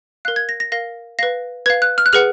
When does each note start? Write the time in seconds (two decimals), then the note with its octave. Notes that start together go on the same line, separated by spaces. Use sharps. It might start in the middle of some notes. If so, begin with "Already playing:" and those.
0.25 A#4 F5 F#6
0.36 G#6
0.49 A#6
0.60 A#6
0.72 A#4 F5 A#6
1.19 B4 F5 A#6
1.66 B4 F5 G#6
1.82 F#6
1.98 F6
2.06 F#6
2.13 G#4 B4 F#5 F6